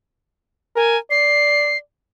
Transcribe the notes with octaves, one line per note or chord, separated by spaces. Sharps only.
A#4 G#5
D5 C7